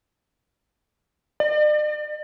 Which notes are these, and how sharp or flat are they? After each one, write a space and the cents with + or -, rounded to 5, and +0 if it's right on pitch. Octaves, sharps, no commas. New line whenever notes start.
D5 +45